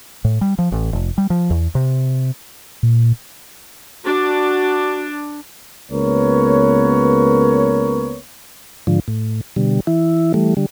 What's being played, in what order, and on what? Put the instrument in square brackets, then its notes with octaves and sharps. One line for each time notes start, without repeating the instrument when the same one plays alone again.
[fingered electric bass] A2
G3
F3
A1
F1
G3
F3
E2
C3
[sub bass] A#2
[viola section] D4 [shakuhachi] F#4
[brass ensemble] C#2 A#3 B3 A#4 B4 C#5
[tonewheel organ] G#2 D3 F3
A2
B2 D3 G3
E3 E4
E3 G3 A3
D3 G3